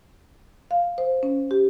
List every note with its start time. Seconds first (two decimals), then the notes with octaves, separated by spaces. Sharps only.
0.71 F5
0.98 C5
1.23 C#4
1.51 G4